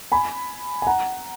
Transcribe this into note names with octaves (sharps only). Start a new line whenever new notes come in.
G#5 B5
G#5
F#5 A#5